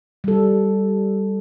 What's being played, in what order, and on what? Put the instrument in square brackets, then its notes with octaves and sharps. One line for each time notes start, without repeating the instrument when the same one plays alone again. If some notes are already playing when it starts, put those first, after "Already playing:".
[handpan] G3 A4